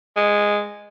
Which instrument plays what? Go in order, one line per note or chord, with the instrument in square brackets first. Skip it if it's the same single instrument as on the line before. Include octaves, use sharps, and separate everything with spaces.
[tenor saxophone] G#3